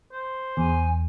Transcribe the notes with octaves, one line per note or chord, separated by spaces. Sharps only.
C5
E2 G#5